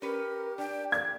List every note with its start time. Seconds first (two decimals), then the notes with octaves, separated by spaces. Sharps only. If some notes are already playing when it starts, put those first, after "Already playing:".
0.02 C#4 G4 A#4 B4
0.58 D4 G5
0.92 D5 G#6